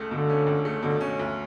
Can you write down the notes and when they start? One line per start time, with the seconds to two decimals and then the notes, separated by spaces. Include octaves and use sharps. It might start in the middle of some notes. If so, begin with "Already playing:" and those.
Already playing: C#2 A3
0.11 B2 D3
0.29 C#4
0.47 C#2
0.65 A3
0.83 B2 D3
1.01 C#4
1.20 D2